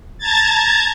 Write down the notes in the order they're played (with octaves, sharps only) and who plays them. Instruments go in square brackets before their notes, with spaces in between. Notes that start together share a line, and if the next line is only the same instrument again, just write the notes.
[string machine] A5 A#5 G#6 A6